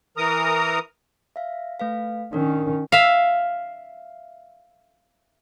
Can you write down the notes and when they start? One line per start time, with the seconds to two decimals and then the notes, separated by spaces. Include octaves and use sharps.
0.17 E3 A#4 A#5 D#6
1.36 E5 F5
1.80 A3 B4 F5
2.33 D#3 C#4 D4 A#4
2.92 E5 F5